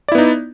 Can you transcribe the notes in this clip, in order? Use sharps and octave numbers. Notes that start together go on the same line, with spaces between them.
B3 D#4 E4 D5